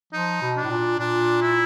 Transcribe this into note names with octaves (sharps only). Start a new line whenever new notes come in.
F3 D#4
B2
D4
A2
A#2
A#2 D4
E4